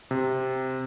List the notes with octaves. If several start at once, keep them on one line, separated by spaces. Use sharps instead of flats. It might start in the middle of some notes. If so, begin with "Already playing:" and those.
C3